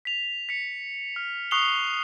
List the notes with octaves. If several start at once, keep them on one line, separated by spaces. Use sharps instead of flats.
B6 F7
B6 C#7
F6
C#6 D#6 F#6 C7 F7 G7